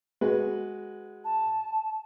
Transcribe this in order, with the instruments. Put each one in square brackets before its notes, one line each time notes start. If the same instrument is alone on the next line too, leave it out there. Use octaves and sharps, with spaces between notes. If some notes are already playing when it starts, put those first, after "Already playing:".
[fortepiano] G#3 F#4 B4
[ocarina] A5